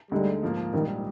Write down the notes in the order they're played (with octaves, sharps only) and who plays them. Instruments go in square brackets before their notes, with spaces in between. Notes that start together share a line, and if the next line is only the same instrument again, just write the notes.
[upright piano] D2 D3 G#3 D#4 [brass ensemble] G3
[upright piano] G#2 F3 A#3
[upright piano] A#1 G#2 G3 [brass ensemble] D#3